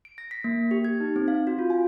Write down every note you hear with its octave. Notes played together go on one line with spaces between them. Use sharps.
D7
A#6
B6
A#3
G4
G#6
D#4
C4
F5
F#4
F4
G#5